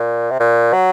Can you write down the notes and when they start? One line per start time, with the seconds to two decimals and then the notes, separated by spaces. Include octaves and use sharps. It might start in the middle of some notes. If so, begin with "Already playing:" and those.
Already playing: A#2
0.31 C3
0.40 A#2
0.73 F#3